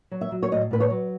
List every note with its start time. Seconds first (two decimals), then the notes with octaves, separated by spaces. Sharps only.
0.11 F#3
0.21 E5
0.32 F#3
0.43 C#5
0.51 A2 D#5
0.71 A2 B4
0.80 C#5
0.91 F#3